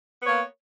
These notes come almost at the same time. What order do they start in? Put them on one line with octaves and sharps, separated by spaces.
B3 C#5 A#3